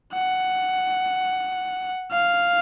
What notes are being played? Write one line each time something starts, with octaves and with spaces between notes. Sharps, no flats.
F#5
F5